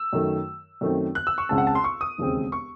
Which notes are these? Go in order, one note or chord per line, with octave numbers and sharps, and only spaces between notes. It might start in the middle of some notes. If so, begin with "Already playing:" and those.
Already playing: E6
F#2 D#3 A3
F#2 D#3 A3 C4
F#6
E6
C#6
C#2 C#3 G#3 C4 A5
F#5
A5
C6
C#6
D#6
E1 D#2 C#3 G#3 C4
C#6